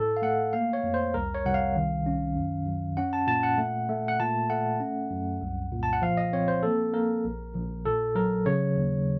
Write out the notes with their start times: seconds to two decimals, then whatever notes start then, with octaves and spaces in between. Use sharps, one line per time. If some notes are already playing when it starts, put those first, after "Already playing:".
Already playing: A2 A4
0.17 F5
0.22 A3 F#5
0.53 A#3 F5
0.73 C#5
0.84 F2
0.94 C5
1.14 C2 A#4
1.35 C#5
1.45 C2 F#5
1.54 F5
1.76 D#3
2.06 C#4
2.36 F#2
2.67 F#2
2.97 C#4 F#5
3.13 A5
3.27 A#2 A5
3.43 F#5
3.58 A3
3.89 A3
4.08 F#5
4.20 A#2 A5
4.50 A3 F#5
4.80 C#4
5.11 F#2
5.41 C2
5.72 A#2
5.83 A5
5.93 F#5
6.02 F3 F5
6.17 D#5
6.33 C4 C#5
6.48 C5
6.63 A#3 A4
6.94 A#3 A#4
7.25 A#1
7.54 A#1
7.85 A#2 A4
8.15 F#3 A#4
8.46 C#3 C#5
8.77 D#2